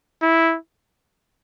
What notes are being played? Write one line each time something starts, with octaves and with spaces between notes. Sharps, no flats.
E4